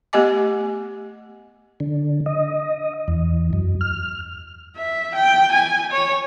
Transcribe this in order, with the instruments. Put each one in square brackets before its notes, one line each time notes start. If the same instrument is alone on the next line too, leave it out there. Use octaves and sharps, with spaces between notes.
[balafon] A3 B3 G4 D#5 G#5 D6
[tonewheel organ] D3
D#5
E2
F#2
F6
[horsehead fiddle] E5
G5
G#5
C#5